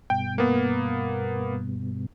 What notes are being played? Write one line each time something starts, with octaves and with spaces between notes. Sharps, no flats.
G2 B2 G5
A#3 B3